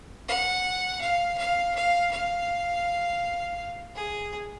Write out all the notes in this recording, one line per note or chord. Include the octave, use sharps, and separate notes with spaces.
F#5
F5
F5
F5
F5
G#4